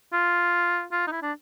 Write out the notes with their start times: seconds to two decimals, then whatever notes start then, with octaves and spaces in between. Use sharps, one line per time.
0.13 F4
0.92 F4
1.07 D#4
1.12 E4
1.22 D4